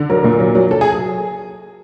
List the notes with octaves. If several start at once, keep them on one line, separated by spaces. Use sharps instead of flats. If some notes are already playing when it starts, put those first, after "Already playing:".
Already playing: D3
F#3 A#4
A#2
F#3
F#3
F#3 A4
G#4